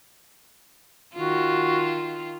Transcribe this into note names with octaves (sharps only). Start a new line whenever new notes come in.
D#3 F4 F#4